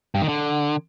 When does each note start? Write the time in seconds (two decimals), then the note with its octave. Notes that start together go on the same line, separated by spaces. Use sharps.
0.15 G2
0.22 D#3
0.28 D3